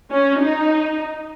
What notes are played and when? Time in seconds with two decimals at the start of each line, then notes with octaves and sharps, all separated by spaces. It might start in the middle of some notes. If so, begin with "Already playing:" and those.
0.11 C#4
0.40 D#4